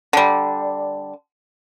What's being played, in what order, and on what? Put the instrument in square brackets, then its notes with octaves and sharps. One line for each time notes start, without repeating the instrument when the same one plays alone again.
[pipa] D3 G3